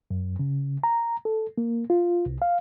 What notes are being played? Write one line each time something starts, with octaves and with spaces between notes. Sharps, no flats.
F#2
C#3
A#5
A4
A#3
F4
C2
F5